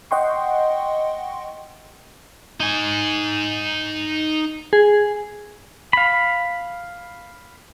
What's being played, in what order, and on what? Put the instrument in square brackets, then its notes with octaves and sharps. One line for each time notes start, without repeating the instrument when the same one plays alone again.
[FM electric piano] D#5 F#5 G5 C6 C#6
[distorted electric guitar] D#4 G#5
[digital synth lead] G#4
[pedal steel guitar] F5 B5